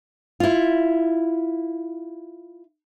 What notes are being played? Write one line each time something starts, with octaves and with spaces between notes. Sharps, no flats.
E4 F4